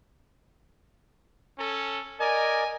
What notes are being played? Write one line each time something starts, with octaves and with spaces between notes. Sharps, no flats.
C#4 A4
A#4 D5 D#5 G#5